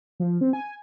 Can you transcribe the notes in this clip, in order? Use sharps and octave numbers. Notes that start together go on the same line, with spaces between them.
F3
C4
G#5